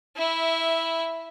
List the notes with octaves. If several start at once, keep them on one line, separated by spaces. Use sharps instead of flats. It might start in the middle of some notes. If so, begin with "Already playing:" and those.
E4 E5